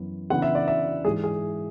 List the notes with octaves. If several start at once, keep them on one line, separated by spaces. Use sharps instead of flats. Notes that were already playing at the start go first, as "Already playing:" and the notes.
Already playing: F#2 E3 B3
C#3 E3 B3 D4 F#5
E5
D5
E5
G#2 E3 G#3 G#4
G#4